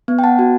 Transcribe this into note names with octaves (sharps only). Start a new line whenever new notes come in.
B3
G5
F#5 A5
F#4